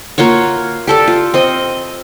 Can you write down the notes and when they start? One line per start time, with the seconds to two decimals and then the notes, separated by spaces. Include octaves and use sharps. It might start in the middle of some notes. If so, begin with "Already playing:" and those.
0.18 A#3 F4 F#4 C#5
0.87 G4 A4 D5
1.07 F4
1.34 C4 D#5